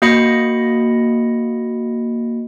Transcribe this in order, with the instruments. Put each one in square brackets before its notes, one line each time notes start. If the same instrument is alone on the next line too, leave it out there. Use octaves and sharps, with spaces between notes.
[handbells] A#3 F#4 D#5 B5 C#7